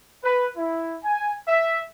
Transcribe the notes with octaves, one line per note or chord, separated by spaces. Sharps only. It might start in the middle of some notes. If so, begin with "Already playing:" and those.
B4
E4
G#5
E5